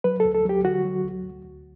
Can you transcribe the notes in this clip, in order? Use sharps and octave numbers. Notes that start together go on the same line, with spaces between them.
F#3 B4
D2 A4
A4
F#3 G4
D3 F#4
F#3
D2
D2
D2